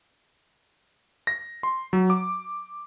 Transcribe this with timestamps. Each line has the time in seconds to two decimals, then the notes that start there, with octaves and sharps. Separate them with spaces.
1.27 A#6
1.63 C6
1.93 F#3
2.10 D6